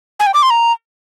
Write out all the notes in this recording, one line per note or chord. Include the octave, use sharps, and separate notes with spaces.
G#5
G5
D6
C6
A#5